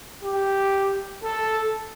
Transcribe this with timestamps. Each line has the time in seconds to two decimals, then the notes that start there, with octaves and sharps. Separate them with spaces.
0.23 G4
1.23 A4